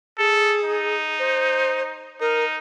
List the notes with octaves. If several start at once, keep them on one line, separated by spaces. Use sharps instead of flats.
G#4 A4
D#4
C5
D#4 A#4